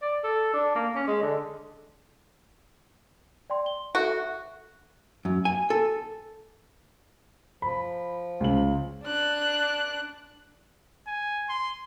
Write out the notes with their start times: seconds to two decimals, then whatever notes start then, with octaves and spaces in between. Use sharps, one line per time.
0.02 D5
0.24 A4
0.54 D4
0.75 A#3
0.95 C#4
1.07 G#3
1.23 D3
3.50 D5 G5 C6
3.66 G7
3.95 F#4 A4 E5
5.25 F#2
5.45 G#5
5.70 A4
7.62 F3 B5
8.40 C#2 F#7
9.04 D4 F#6
11.07 G#5
11.49 C6